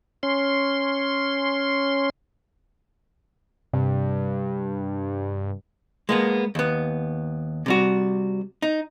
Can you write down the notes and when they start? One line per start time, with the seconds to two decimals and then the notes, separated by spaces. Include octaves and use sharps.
0.23 C#4 C6
3.73 G2 C3
6.09 G#3 A#3 B3
6.55 D#2 B3
7.66 C3 G3 F#4
8.62 D#4